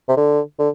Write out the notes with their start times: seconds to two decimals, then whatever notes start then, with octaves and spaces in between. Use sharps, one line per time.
0.09 C3
0.17 D3
0.59 D3